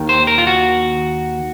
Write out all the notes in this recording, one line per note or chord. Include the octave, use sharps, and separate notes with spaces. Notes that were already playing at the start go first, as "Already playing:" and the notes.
Already playing: D#2 D#3
C5
A#4
F4
F#4